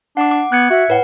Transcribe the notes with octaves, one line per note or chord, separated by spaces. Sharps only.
D4 F#5 D6
D6
B3 F#6 G#6 C#7
F#4 E5
A2 B4 F#5